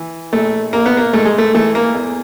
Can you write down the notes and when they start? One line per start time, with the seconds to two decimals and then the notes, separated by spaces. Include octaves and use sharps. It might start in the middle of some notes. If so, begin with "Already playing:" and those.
Already playing: E3
0.33 A#1 A3
0.73 A#1 A#3
0.86 B3
0.97 A#3
1.13 G#2 A3
1.25 G#3
1.38 A3
1.54 E3 A3
1.75 A#3
1.95 E2